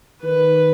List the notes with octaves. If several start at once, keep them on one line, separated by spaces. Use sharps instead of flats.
D#3 B4